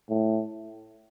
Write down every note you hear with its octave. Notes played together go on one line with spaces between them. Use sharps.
A2